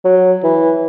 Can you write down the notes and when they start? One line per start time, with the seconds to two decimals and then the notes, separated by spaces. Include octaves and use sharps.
0.05 F#3
0.44 E3